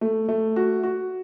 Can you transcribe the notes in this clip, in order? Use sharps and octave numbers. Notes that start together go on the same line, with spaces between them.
A3
A3
F#4
F#4